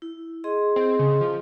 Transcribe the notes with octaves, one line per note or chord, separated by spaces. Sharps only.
E4
G#4 D#5 C6
C4
C#3
F3